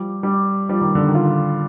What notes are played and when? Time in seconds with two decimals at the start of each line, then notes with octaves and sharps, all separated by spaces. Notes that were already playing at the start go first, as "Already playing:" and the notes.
Already playing: F3 G3
0.23 G3
0.69 F3 G3
0.81 D#3
0.95 D3
1.08 D#3
1.15 F4